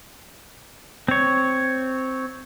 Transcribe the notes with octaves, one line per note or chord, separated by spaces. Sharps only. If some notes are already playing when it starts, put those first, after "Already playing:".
C4 C#5